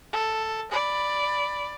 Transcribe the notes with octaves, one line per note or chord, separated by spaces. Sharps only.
A4
D5 B5